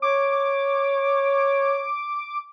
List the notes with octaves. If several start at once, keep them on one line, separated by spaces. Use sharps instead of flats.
C#5 D6